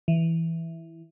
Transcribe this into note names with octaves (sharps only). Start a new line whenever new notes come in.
E3